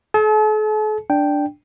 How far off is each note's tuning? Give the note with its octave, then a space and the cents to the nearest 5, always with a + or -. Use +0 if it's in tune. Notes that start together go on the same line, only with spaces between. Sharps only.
A4 -45 A5 -40
D4 +0 G5 +0